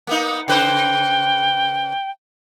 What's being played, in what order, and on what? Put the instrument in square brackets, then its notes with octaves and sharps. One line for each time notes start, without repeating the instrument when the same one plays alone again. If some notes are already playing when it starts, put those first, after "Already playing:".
[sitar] A#3 B3 D#4
[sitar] C#3 B4 C5 [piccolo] G5